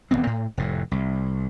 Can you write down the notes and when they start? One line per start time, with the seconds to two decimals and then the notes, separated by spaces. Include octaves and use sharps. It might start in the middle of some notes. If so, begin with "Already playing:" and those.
0.11 D#1 A#2 B3 C4
0.27 A2
0.57 F1 A2
0.91 C2